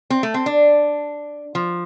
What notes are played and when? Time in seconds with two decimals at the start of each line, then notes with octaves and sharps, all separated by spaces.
0.10 C4
0.23 A3
0.34 C4
0.46 D4
1.55 F3